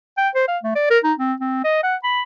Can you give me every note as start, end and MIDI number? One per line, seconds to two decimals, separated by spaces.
0.18 0.29 79
0.35 0.44 72
0.48 0.58 77
0.63 0.75 57
0.75 0.87 74
0.91 0.99 70
1.04 1.13 63
1.19 1.34 60
1.40 1.60 60
1.64 1.82 75
1.83 1.96 78
2.04 2.22 83